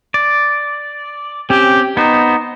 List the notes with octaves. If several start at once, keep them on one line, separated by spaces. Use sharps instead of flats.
D5
C4 C#4 G4
B3 D#4 C5